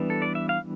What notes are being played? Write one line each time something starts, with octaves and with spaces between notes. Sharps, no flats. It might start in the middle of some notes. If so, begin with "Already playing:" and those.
Already playing: E3 G3 B3 D4
A4
D5
E5
F5